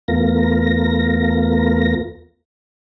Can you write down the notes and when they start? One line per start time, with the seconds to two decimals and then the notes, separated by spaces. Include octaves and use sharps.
0.08 E2 A3 B3 F4 A#4 A#6